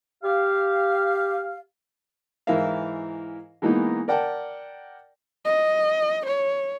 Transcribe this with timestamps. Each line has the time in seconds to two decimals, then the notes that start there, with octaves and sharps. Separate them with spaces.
0.23 G4 F5
2.47 G#2 E3 E4 A#4 E5 F5
3.62 E3 G#3 A#3 B3 D#4
4.08 A#4 D5 F#5 G5 A5
5.45 D#5
6.26 C#5